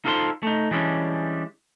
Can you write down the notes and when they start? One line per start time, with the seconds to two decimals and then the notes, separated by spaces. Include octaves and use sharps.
0.05 D#4 F4 A4 C5 F5 C6
0.43 A3 D#4
0.71 E3 G3 G#3 C#4 D4